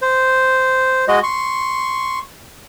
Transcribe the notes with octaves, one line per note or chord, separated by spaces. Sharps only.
C5
G#3 F#4 D#5
C6 C#6